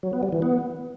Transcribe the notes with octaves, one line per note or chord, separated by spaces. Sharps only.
F#3
B3
G3
E3
B3